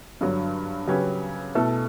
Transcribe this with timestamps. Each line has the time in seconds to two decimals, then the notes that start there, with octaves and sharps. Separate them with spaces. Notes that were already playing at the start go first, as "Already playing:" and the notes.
0.21 G2 D3 F#3
0.87 C#3 F#3 C#4 G4 B4
1.55 B2 A3 E4 A4